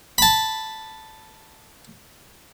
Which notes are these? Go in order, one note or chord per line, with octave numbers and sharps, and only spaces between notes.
A5 B5